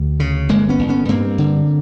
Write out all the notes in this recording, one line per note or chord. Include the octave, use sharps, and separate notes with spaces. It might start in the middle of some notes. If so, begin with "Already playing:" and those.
Already playing: D2
C#3
G1 G#3 A#3
B3 C#4
G1
B3 C#4
G2 A#3 C4
D3